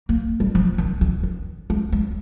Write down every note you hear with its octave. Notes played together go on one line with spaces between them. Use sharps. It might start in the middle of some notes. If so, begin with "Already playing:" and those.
A#3
G3
F3
D#3
D#3
D#3
G#3
G#3